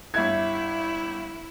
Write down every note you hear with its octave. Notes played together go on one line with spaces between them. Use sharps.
G1 E4 E5 G#6